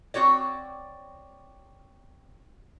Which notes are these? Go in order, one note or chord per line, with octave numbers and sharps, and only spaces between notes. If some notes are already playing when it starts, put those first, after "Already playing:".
C4 F#4 C#5 D5